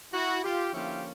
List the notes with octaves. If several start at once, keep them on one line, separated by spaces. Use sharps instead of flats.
E4 F#4
F4 G4
D3 F3 A#3 C#4 E4 F4 G4